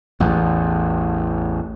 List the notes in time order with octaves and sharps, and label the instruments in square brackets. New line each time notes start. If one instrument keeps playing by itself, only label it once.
[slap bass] A1 E2